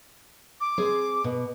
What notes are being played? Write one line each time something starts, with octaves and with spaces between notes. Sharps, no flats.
D6
C4 G#4 C5
B2